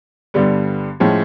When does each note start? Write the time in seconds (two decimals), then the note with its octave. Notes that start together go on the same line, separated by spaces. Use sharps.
0.34 G2 D3 G3 B3
1.00 A2 F3 G#3 C#4